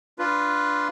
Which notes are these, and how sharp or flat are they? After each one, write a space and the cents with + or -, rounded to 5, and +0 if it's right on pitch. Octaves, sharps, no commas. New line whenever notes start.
D4 +0 F4 +0 B4 +0